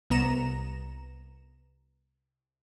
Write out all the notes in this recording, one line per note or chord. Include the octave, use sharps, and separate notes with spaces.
C2 B3 A#5 E7